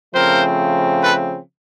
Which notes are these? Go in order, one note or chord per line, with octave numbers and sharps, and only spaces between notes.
C#3 F3 A3 C4 A#4 C5
A4 B4